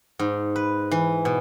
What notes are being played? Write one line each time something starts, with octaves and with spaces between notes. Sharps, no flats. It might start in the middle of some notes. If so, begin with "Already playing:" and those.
G#2
B4
E3
B2